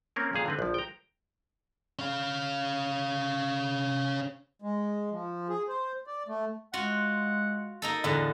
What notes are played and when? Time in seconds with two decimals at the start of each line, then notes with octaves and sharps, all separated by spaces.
0.16 A#3 C4 C#4 A#4
0.33 F2 A#2 G#4 F5
0.46 D3 C4 B4
0.59 A#1 F3
0.74 G5 A#5
1.99 C#4 F5
4.62 G#3
5.11 F3
5.49 G#4
5.68 C5
6.07 D5
6.28 A3
6.74 G#3 F4 F#4 F#5
7.82 A#3 D#4 A4
8.04 E2 A2 D3